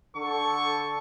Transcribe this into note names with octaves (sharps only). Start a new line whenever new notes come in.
D3 A4 C#6